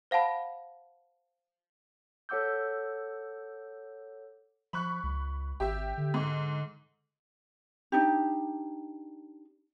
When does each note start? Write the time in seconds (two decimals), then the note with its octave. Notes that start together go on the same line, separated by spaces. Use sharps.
0.11 C5 F5 F#5 A5 B5
2.29 A4 C#5 F#5 D6 E6 G6
4.73 F3 B5 C#6 F#6
5.03 C#2
5.60 G#1 G4 E5
5.97 D3
6.14 G#2
7.92 D4 D#4 G4